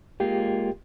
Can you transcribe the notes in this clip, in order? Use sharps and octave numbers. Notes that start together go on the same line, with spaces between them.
G#3 A#3 F4 G4 G5